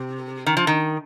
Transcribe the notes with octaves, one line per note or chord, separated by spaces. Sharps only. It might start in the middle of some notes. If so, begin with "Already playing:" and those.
Already playing: C3
D#3
F3
D#3